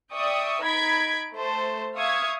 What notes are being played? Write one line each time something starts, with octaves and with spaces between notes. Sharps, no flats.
D5 E5 G5 C#6 D#6
D#4 B5 G#6 B6 D7
A3 C5 A5
E5 F5 C#6 D#6 G#6